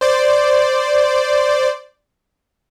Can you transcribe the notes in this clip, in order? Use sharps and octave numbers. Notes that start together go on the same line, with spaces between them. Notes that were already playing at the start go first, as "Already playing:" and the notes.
C5 D5